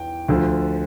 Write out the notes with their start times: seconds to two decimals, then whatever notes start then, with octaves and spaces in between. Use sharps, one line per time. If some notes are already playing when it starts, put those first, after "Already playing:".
Already playing: E2 G5
0.28 D2 D3 F3